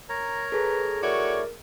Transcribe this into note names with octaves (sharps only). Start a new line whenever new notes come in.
A#4 C#5 A#5
G#4 A4 B4
A3 E4 F#4 A#4 C#5 D5